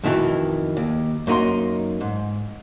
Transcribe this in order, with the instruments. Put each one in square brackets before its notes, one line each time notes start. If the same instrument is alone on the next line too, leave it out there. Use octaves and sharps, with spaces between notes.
[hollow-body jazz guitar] F2 B2 D#3 E3
D#2
F#2 A#3 D#4 A#5 C6
G#2